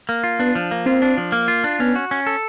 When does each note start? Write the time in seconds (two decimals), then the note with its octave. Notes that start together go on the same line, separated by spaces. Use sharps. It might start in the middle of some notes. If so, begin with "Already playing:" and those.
0.09 A#3
0.24 F4
0.40 B3 D4
0.55 F3
0.71 A#3
0.86 C4 F4
1.02 D4
1.18 F3
1.32 A#3
1.48 F4
1.64 D4
1.80 B3 C#4
1.96 F#4
2.11 C#4
2.27 A4